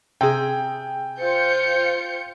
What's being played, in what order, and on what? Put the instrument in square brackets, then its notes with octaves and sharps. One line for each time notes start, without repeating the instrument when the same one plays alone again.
[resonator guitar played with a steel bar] C3 G#4 [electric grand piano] G5
[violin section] F4 G6 C#7 [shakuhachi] C5